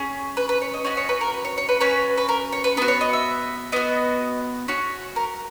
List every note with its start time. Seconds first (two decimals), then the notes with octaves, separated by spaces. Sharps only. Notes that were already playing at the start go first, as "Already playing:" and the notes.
Already playing: C#4 G#4
0.37 B4
0.49 B4
0.62 C#5
0.74 D#5
0.84 C#4 F#4 D#5
0.97 C#5
1.09 B4
1.21 A#4
1.34 B4
1.45 C#5
1.58 C#5
1.69 B4
1.81 C#4 F#4 B4
2.18 B4
2.29 A#4
2.52 C#5
2.64 B4
2.77 B3 B4
2.82 F#4
2.88 C#5
3.01 D#5
3.13 E5
3.72 B3 F#4 D#5
4.68 C#4 F#4 C#5
5.16 A#4